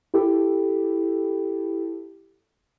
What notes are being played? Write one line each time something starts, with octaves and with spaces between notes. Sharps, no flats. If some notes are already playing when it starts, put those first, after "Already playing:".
E4 G4 A4